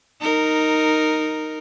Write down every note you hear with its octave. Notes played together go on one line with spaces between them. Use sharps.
D#4 A#4